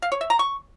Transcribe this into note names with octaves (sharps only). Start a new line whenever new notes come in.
F5
C#5
E5
A#5
C#6